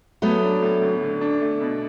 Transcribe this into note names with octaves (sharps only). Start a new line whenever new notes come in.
F#3 A3 B3
D4
A2
D2
D3
D4
A3
B2